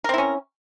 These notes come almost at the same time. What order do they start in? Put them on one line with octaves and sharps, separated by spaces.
A#4 C4 E4 C#4